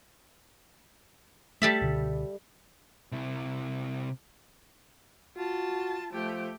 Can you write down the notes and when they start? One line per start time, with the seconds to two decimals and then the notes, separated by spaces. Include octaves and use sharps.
1.62 G3 A3 A4 E5
1.81 C#2 B2 D3
3.12 C3 E4
5.37 F4 F#4 A5
6.13 F3 A3 G4